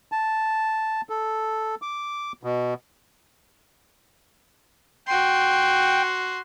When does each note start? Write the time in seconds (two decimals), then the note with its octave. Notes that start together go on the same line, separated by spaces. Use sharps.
0.12 A5
1.09 A4
1.82 D6
2.43 B2
5.08 F#4 G5 C6